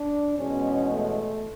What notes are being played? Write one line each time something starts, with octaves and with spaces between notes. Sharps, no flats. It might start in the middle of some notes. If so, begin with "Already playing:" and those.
Already playing: D4
E2 B2 G#3 C#4
A3